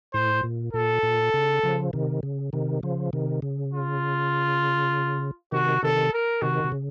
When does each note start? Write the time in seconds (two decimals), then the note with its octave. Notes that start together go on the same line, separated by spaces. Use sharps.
0.13 A2 C5
0.43 A#2
0.73 A#2 A4
1.03 A#2
1.34 C#3
1.63 C#3 F3
1.93 C3 D#3
2.23 C#3
2.53 C3 D#3
2.83 C#3 F3
3.13 C3 D#3
3.42 C#3
3.73 F4
5.52 C3 D#3 F#4
5.83 C3 D#3 A4
6.13 A#4
6.42 C3 D#3 F#4
6.64 C3
6.72 C#3